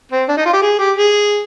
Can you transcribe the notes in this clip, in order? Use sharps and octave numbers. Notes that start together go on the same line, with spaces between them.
C4
D4
D#4
F4
G4
G#4
G4
G#4